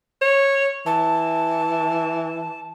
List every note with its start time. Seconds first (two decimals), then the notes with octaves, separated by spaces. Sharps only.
0.22 C#5
0.86 E3 A5